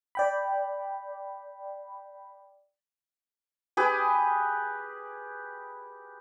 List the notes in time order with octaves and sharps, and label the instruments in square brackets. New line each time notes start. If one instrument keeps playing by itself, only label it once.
[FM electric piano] D5 G5 B5
[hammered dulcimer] G4 G#4 B4